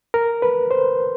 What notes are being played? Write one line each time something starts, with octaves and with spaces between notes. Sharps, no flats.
A#4
B4
C5